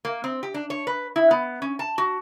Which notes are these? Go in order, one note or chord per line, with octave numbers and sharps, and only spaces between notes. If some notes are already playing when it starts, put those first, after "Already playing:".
A#3
C4
G4
D4
C#5
B4
E4
B3
C#4
A5
F#4